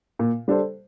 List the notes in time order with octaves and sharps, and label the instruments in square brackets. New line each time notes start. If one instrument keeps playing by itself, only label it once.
[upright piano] A#2
G3 D4 A4 C5